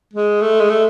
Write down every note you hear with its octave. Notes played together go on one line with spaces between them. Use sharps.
G#3
A3
G#3
A3